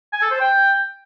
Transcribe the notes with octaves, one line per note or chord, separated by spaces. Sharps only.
G#5
A4
C5
G5